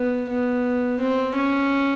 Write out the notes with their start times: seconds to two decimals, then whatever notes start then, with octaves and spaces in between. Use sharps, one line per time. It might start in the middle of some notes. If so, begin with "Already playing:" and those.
Already playing: B3
0.29 B3
1.00 C4
1.35 C#4